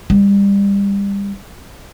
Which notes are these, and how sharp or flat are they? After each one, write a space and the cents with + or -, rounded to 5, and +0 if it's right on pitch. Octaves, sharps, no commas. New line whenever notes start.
G3 +30